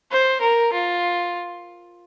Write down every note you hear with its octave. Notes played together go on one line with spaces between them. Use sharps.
C5
A#4
F4